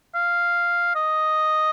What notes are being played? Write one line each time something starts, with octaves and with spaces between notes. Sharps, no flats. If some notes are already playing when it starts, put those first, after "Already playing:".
F5
D#5